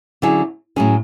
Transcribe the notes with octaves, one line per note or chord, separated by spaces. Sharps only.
D3 F#3 C#4 E4 G#4
A2 F#3 C#4 G#4